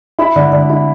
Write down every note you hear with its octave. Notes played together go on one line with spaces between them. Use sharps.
E4 B5
D3
D3
E4